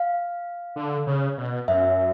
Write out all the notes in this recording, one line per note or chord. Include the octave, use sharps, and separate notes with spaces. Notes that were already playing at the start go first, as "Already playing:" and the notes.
Already playing: F5
D3
C#3
B2
F#2 E5